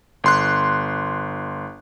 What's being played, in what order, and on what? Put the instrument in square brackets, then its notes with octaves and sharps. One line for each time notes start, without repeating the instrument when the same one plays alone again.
[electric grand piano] G1 C6 F#6